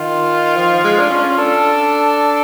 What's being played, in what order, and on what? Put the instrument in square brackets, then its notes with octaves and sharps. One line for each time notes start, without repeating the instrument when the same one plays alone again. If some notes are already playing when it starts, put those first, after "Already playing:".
Already playing: [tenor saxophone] D#3 [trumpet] F4
[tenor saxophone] F3
G#3
D4
C#4
[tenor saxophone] D4 [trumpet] A4